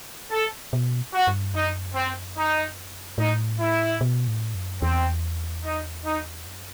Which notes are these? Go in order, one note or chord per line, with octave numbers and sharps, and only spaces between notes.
A4
B2
F#4
G2
F#2 D#4
C4
D#4
A2 D#4
E4
B2
A2
F#2
E2 C4
D#4
D#4
F#2